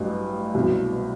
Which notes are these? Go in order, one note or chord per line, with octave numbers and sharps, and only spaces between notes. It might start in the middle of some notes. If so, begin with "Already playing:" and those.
Already playing: A1 G2 F#3
C2 B2 F#3